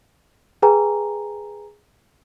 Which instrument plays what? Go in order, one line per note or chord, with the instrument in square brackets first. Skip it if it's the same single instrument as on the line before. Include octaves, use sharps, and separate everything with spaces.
[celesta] G#4 B4 G5 G#5 A#5